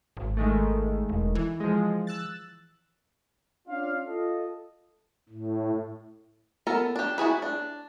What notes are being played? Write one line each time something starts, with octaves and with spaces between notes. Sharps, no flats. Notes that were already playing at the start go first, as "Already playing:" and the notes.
G#1
D#3 G#3 A3
E1
E3
F3 G#3
E6 F#6 A6
C#4 D4 F4 D5 F5
F4 A4 D#5
A2
B3 A4 A#4
D4 G4
E4 F#4 G#4 B4
D4